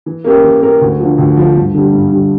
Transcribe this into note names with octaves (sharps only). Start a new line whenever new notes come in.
E3
A#3 C#4 G4 A#4
E3
A#3 C#4 G4 A#4
D2
D3 F3
D2
D3 F3
G2
D3 G3
G2
D3 G3